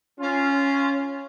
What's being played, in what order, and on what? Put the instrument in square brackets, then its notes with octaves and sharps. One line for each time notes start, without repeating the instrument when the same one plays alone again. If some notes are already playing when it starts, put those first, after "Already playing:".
[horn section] C#4 F4